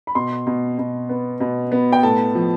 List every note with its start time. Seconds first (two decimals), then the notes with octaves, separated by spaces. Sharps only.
0.07 B5
0.15 B2 C6
0.47 B2
0.78 B2
1.09 B3
1.40 B2
1.72 B3
1.93 G5
2.03 A2 A5
2.35 F3